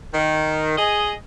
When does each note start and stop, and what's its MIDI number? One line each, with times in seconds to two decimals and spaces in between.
0.14 0.75 51
0.78 1.12 68
0.78 1.12 75